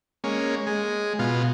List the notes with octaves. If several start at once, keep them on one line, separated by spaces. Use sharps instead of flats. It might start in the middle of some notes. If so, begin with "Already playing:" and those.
G#3 A#3 C#4
G#3
B2 F4